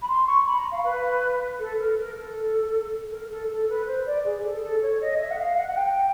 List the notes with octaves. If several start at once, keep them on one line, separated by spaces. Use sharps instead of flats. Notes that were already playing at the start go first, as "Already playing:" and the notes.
B5
C6
C#6
B5
A#5
F5
B4
A4
A#4
A#4
A4
A#4
A4
A4
B4
C5
D5
G#4
A4
A4
C#5
D#5
E5
F#5
F5
F#5
F#5
G5